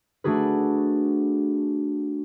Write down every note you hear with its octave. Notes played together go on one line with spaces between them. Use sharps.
A3 D4 F#4 G#4 B4